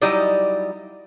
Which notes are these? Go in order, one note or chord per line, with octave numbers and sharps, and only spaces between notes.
F#3 G3 D#4 E4 D5 D#5